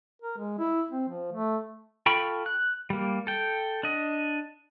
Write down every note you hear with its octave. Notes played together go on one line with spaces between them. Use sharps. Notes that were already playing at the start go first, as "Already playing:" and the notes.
A#4
G#3
E4
C4
F3
A3
F4 A4 G5 B5 C#6
F#6
G3 A#3
A4 G5
D4 D#5